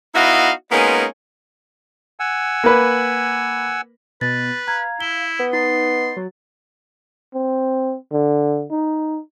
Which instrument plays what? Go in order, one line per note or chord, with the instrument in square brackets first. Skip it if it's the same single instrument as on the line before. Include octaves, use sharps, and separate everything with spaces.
[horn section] B3 D#4 E4 F#4 D#5 F5
G#3 A#3 B3 C#4 D#4 F4
[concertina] F#5 G#5 E6
[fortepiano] A#3 B4
[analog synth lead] B2 [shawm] B4 [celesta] A6
[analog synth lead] F5 [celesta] A#5 G#6
[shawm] E4 [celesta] G7
[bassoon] B3
[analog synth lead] D#4 [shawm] C6 [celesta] A6
[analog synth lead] F#3
[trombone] C4
D3
D#4